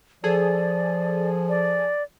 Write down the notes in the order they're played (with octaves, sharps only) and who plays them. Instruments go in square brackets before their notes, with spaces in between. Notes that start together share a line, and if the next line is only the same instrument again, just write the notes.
[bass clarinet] F3 [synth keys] G#4 A4 [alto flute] D5
[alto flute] D5